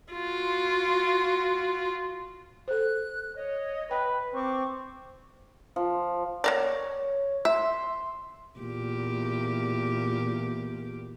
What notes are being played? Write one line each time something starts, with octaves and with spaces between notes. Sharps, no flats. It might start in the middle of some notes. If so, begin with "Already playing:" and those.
F4 F#4
A4 C5 F#6
C#5 D#5
B4 G5
C4 C#6 D6
F3
A#3 A#4 C#5 D5
E5 C6
E2 A#2 G4